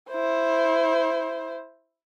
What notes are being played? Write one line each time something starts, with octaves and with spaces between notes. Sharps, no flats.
E4 C5